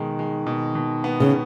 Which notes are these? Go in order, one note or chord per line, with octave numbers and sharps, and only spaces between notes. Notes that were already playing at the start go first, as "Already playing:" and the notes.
Already playing: B2 D#3 G#3
G#3
B2
B2
B3
C#3